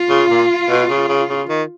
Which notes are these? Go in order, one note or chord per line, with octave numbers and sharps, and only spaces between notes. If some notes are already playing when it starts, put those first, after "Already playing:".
Already playing: F4
C#3
A#2
B2
C#3
C#3
C#3
D#3